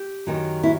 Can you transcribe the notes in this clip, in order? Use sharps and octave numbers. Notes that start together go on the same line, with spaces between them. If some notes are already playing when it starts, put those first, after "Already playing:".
Already playing: G4
F#2 D#3 F#3
E4